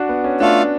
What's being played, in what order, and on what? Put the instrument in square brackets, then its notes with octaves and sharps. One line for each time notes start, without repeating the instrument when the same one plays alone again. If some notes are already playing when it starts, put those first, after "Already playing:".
Already playing: [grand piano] D4 F#4
B3
C#4
[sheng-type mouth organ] A3 F4 A4 F5 [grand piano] D4